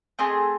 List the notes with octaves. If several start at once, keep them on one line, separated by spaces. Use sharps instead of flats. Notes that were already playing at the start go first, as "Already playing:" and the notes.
A3 C4 G#4 D#5